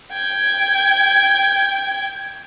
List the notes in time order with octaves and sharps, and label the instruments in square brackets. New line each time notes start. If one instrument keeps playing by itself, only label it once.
[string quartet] G5 G#6